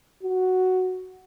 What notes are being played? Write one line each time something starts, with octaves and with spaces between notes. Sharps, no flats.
F#4